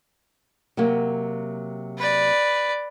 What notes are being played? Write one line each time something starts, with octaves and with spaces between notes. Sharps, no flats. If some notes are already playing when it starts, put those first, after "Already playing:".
C3 F#3 A#3
B4 D5